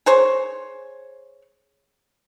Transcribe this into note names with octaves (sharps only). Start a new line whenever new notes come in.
G#4 C5 C#5